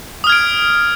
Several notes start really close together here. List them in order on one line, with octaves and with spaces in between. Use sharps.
D#6 F6 G#6 D7